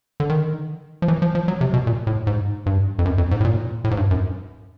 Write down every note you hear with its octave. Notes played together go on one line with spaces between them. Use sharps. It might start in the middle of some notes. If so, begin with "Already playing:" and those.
D3
D#3
F3
E3
F3
F3
F#3
C3
B2
A#2
A2
G#2
G2
F2
F#2
F2
G#2
A2
A#2
A2
G#2
G2
F#2